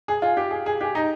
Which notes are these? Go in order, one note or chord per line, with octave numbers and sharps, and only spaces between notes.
G#4
F4
G4
G#4
G#4
G4
D#4